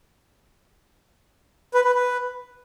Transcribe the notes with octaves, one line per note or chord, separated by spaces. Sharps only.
B4
B4
B4